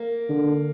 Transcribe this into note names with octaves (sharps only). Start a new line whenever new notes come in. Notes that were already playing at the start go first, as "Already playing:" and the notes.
Already playing: A#3
D3